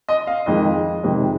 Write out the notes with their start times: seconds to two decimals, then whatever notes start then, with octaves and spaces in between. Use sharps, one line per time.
0.09 D#5
0.27 F5
0.46 F2 D#3 G#3 D#5
1.03 F2 C3 D#3 G#3